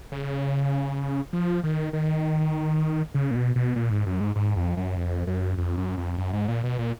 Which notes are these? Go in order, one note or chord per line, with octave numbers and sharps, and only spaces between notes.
C#3
F3
D#3
D#3
C#3
A#2
B2
B2
A#2
G#2
F#2
G#2
G#2
F2
F#2
F2
F#2
F2
F#2
F2
F#2
G#2
A#2
B2
A#2